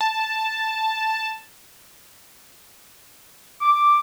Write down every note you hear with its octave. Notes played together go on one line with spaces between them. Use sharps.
A5
D6